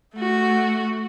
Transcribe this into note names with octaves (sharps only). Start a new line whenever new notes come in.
A3 F#4